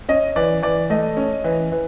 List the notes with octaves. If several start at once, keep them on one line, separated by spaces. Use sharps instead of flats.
C#4 D#5
E3 D5
E3 D5
A3 D#5
C#4
E3
E3